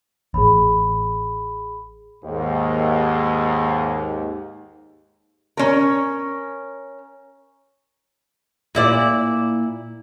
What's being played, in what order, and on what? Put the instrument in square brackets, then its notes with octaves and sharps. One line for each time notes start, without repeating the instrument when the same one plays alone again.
[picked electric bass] A1 [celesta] G#4 B5
[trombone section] D#2 G#2
[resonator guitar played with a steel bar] C#4 A#4
[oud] A#2 E4 D5